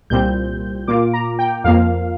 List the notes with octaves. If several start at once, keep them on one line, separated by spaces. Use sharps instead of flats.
C2 A#2 G3 C4 G6
A#2 A#3 F4 D6
A#5
G5
F2 F3 A#3 F5